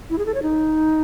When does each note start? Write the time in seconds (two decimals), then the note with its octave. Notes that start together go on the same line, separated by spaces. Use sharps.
0.10 E4
0.18 G#4
0.26 A4
0.34 C#5
0.42 D#4